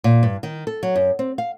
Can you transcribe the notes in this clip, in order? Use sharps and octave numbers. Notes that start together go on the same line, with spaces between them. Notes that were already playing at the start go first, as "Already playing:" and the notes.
A#2
G2
D#3
A4
F#3
F#2
C4
F5